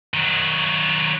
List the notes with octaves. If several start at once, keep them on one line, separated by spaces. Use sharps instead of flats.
D#3 F#3